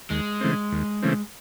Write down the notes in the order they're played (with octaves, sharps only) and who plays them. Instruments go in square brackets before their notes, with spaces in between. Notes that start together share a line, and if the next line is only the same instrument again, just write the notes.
[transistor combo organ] D#2 [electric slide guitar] G#3
[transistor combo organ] C#3 E3 A3 C4
D#2
C#3 E3 A3 C4